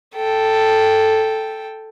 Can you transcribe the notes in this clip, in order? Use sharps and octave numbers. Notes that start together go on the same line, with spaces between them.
A4 G5